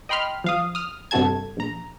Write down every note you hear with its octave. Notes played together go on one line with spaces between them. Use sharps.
D#5 G5 B5 C6 F6
F3 F5 D#6
D#6 F6
G2 C3 F#4 A4 A5 G#6
A#1 A#5